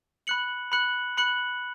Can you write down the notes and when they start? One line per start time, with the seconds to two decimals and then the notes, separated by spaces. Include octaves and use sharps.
0.27 B5 F#6 C#7 F#7
0.72 B5 F#6 C#7 F#7
1.17 B5 F#6 C#7 F#7